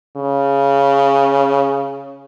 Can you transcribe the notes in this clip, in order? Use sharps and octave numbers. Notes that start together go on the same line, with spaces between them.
C#3